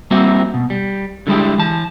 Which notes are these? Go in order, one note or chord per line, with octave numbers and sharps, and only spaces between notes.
G3 A#3 C4 F#4 E5
B2
G3
D3 G3 G#3 E4 G4
E3 A5